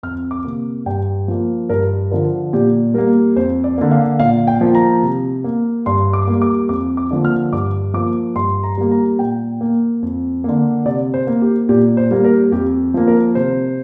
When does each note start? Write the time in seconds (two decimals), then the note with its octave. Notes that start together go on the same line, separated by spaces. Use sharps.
0.03 F2 F6
0.31 D6
0.45 C3 A#3
0.86 G2 G5
1.28 F3 A#3
1.70 G2 A#4
2.11 D3 F3 A#4
2.53 A#2 G4
2.94 G3 A#3 A#4
3.36 F2 C5
3.64 D5
3.78 D3 A#3
3.92 F5
4.20 A#2 F5
4.47 G5
4.61 F3 A#3
4.75 A#5
5.03 C3
5.44 A#3
5.86 G2 C6
6.13 D6
6.28 G3 A#3
6.42 D6
6.69 F2 D6
6.97 D6
7.11 D3 F3 A#3
7.25 F6
7.53 G2 D6
7.94 F3 A#3 D6
8.36 G2 C6
8.63 A#5
8.78 G3 A#3
8.91 A#5
9.19 A#2 G5
9.61 A#3
10.02 F2
10.44 D3 A#3
10.85 C3 D5
11.14 C5
11.27 A#3
11.42 G4
11.69 A#2 G4
11.97 C5
12.11 G3 A#3
12.24 A#4
12.52 F2 G4
12.94 F3 A#3
13.08 A#4
13.35 C3 C5